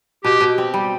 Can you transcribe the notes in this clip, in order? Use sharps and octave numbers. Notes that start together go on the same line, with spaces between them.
B2 G4
B2
C4
G3